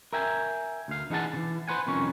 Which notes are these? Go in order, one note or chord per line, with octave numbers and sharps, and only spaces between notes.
A#4 E5 G5 G#5
D2 F5
E3 D#4 G#4 F#5 A5
C#3 E3
B4 C5 F#5 G#5
C2 F2 D#3 C#4 C#5